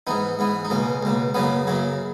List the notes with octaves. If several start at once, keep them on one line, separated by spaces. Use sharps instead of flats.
G#2 E3 B3 D#4
G#2 E3 B3
D#4
C#2 B2 A#3 C#4
C#2 B2 A#3
F#2 C#3 F#3 A#3 B3
F#2 C#3 F#3 A#3